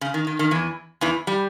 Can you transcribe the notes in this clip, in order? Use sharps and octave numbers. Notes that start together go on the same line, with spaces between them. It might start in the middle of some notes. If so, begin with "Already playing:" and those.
C#3
D#3
D#3
D#3
E2 E3
E2 E3
G3